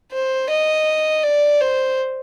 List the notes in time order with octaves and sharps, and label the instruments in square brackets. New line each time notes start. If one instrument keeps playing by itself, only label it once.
[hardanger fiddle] C5
D#5
D5
C5